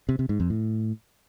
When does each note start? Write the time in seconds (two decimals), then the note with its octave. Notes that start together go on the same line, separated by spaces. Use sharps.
0.09 C3
0.19 C3
0.29 G#2
0.40 F2
0.50 A2